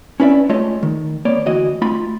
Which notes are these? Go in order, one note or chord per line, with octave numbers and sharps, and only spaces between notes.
C#4 E4 B4 D5 E5
G#3 A3 F4 C#5 D#5
D#3
A#3 B3 C#5 D5
D2 E3 F#4 D#5
A3 F4 B5